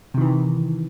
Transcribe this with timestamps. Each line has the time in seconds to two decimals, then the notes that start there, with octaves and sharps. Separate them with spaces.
0.14 C3
0.18 D#3
0.21 E3